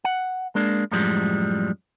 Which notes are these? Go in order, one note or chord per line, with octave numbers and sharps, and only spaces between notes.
F#5
G#3 A#3 D4
F#2 A2 F3 G3 G#3